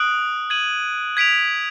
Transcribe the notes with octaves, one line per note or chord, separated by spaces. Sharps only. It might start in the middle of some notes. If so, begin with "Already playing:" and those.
Already playing: D#6 F#6 D7 F#7
G#6 D#7 F#7
G#6 B6 D7 F7